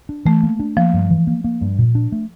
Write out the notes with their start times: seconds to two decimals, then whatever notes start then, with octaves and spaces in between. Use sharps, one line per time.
0.09 D4
0.25 E3 A3
0.43 A#3
0.60 D4
0.77 F3 A#3
0.93 G2
1.11 E3
1.27 A#3
1.44 A#3
1.61 G2
1.79 A#2
1.95 D4
2.12 A3